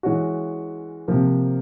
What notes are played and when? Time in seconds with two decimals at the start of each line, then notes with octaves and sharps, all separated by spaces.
0.03 E3 G#3 C#4 F#4
1.08 C3 F3 A#3